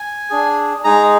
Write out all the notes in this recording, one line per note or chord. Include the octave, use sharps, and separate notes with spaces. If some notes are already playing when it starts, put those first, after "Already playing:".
Already playing: G#5
D4 G#4
G#3 D#4 G#4 A#5